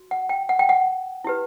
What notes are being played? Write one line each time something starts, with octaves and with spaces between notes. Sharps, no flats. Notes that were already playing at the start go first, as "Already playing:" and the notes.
Already playing: F#4
F#5
G5
F#5
G5
F#5
E4 G4 B4